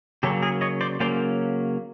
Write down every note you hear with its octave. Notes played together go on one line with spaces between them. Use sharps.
C#3 F#3 A#3 C#4 G4 A4
G#4 A#4
C#5 D#5
C5 D5
C#3 F#3 A#3 C#4 C5 D5